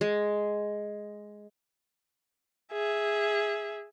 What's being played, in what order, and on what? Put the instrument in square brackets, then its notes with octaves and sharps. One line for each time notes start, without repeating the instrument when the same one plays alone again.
[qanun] G#3
[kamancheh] G#4 E5